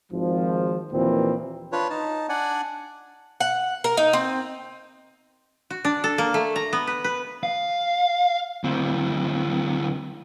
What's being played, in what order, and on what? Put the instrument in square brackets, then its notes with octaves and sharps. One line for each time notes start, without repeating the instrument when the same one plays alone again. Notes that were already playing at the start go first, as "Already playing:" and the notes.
[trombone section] G#1 F3
D#2 A#2 E3 F3 C4
[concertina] D4 F4 B4 C#5
D#4 A5
D4 D5 F#5 G#5
[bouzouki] F#5
A#4
D#4
C4
[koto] F#4
D4
A4
A#3
A3
A#5
B3
B4
B4
[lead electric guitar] F5
D2 C4